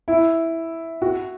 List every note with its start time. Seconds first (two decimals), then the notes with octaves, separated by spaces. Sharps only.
0.08 E4
1.02 F#4